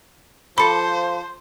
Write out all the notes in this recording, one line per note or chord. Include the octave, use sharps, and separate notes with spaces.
F3 A4 C5 B5 D6